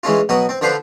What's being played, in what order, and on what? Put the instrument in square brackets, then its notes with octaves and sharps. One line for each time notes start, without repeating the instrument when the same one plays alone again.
[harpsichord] E3 G#3 C#4 F4
B2 F#3 F#4 D#6
C4
D3 F3 B4 C5 C6